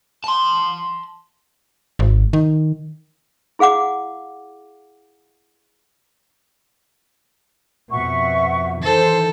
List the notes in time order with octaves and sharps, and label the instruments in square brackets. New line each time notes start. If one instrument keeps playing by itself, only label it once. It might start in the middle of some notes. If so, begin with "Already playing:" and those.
[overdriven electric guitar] A5 C6
[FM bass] G#1
D#3
[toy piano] E4 G#4 F5 F#5 D6
[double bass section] F2 B2 [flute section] E5 F#5 C#6
[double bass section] D#3 E3 [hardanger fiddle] A4 [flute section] C5